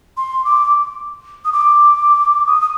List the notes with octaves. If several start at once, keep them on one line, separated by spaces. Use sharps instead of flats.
C6
D6
D#6
D6
D#6
D#6